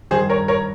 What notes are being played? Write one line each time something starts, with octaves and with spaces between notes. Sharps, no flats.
G2 D#3 G#4 C5
A#4 C#5
A#4 C#5